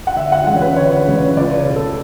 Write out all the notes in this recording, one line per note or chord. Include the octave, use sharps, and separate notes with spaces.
F#5
D2 E5
F#5
C#3 E3 G#3 F#5
C#5
B4
D2 C#5
B4
C#3 E3 G#3
C#5
C#2 D5
C#5
B2 A3
A4